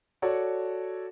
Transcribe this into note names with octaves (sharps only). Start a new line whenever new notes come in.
F#4 A4 C#5 D5